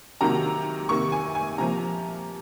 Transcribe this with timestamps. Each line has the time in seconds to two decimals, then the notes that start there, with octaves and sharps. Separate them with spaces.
0.21 C3 D#3 F#3 A#3 A#5
0.89 C3 D#3 A#3 C#6
1.12 G#5
1.35 G#5
1.58 C3 F3 A#3 A#5